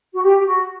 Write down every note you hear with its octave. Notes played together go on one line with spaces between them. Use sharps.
F#4
G4
G4
F#4